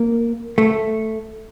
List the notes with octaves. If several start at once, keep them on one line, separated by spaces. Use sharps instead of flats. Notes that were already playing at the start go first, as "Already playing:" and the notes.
Already playing: A#3
A3